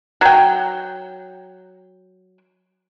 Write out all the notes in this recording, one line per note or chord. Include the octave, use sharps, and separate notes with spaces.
F#3 G5